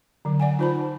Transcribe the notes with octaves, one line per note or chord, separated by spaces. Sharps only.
D3 F#3
D5 F#5 G#5
D#4 F4 C5 A5 B5